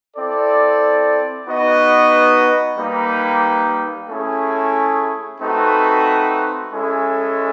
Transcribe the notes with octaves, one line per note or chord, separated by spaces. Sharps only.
C4 E4 A4 D5
B3 D#4 F#4 B4 D#5
G3 A#3 D#4 G4 B4
A3 C#4 E4 G#4
A3 C4 D#4 F#4 B4
G#3 C#4 E4 A4